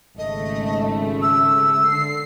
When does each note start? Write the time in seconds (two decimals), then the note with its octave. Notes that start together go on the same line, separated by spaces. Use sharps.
0.18 G#1 C#3 A3 D#5
1.22 E6
1.89 D3 C7